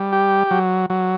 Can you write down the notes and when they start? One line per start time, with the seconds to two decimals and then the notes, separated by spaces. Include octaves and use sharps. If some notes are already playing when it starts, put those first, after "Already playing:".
Already playing: G3
0.13 G4
0.51 F#3
0.90 F#3